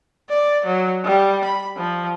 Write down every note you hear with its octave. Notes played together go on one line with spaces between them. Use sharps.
D5
F#3
G3
B5
F3